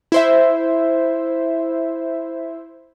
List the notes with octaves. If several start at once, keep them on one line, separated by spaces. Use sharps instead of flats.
E4 C5 E5